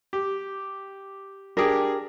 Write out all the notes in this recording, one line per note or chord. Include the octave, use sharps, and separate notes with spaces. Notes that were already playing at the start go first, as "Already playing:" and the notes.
G4
D4 G4 G#4 A#4